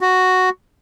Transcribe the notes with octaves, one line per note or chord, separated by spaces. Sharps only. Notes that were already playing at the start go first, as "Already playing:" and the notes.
F#4